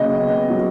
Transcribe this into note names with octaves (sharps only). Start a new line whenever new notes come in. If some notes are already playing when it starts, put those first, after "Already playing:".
Already playing: D#2 C#3 F#3 D#5
B3
F#3